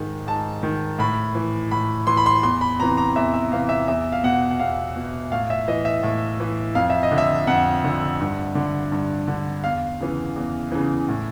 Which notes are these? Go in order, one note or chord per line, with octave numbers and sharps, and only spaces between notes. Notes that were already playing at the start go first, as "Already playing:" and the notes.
Already playing: G#2 D#3
G#2 A5
D#3
A2 B5
E3
A2 B5
E3 C6
B5
C6
E2 C6
B5
C3 E3 A#5
A#5
E2 E5
E5
C3 E3 F5
E5
E2 E5
F5
B2 F#5
F#5
E2 F5
B2
A2 F5
E5
E3 D#5
E5
A2
E3
F2 F5
E5
D#5
D3
E5
F2 F#5
D3
G2
D3
G2
D3
E2 F5
C#3 E3
E2
C#3 E3
A2